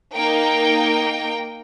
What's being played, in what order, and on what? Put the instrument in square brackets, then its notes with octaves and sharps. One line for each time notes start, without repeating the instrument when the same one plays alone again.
[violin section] A#3 D#4 G5